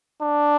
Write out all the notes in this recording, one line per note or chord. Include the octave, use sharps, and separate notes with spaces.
D4